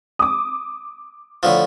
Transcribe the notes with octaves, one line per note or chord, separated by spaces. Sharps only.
D6 D#6
A2 D3 F3